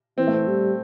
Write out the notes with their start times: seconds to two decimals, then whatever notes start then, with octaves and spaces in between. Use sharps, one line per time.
0.18 E3 C4
0.27 A3
0.33 C4
0.48 G3